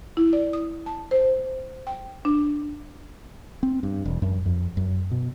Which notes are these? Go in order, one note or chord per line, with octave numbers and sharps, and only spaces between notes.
E4
D5
D#6
A5
C5
G5
D4
C4
G2
E1
F#2
F2
F#2
B2